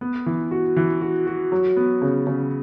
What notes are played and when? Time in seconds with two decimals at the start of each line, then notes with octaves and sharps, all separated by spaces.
0.01 B3
0.26 E3
0.51 F#4
0.76 E3
1.01 F#4
1.27 F#4
1.52 F#3
1.76 B3
2.02 C#3
2.27 C#3